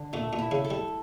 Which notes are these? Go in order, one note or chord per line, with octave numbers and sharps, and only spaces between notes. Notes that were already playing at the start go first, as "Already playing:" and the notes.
Already playing: D3
A#2 A3
A#2
E4
C#3
A4
G3